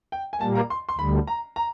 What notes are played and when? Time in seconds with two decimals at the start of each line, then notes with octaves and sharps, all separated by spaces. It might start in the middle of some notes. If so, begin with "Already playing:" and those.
0.12 G5
0.33 G#5
0.41 A#2 G3 A#3 A5
0.55 A#5
0.70 C6
0.89 C6
0.98 D2 D3 G3 B5
1.27 A#5
1.56 A#5